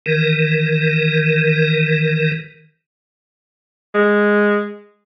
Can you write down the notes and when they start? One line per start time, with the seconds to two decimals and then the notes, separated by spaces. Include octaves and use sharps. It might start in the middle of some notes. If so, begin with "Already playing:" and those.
0.06 D#3 E3 A#4
3.95 G#3